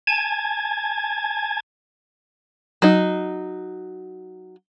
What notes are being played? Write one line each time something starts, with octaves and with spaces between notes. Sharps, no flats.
G#5 A5 G#6
F#3 D#4